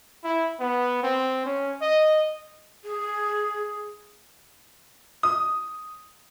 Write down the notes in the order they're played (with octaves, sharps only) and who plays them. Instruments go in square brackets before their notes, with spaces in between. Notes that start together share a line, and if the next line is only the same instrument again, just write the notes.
[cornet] E4
B3
C4
C#4
D#5
[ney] G#4
[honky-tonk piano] D#6